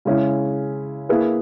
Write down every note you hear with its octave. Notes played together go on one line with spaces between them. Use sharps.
C#3 G#3 C#4 E4
A#3 E4 G#4 B4